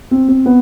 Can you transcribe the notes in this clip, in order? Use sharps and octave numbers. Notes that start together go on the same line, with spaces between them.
C4
C4
B3